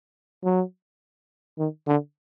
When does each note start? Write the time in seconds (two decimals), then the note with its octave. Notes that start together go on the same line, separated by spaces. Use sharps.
0.44 F#3
1.58 D#3
1.87 D3